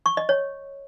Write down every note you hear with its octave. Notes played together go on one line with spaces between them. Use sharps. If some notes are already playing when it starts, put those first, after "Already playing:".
C#6
D#5
C#5